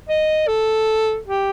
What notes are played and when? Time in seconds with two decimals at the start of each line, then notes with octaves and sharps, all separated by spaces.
0.09 D#5
0.48 A4
1.27 G4